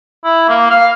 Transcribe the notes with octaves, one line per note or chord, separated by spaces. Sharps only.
E4
A#3
F5